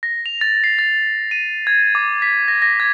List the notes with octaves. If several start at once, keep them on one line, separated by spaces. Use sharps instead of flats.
A#6
F7
A6
C7
A6
D#7
G#6
D6
B6
A#6
A#6
G#6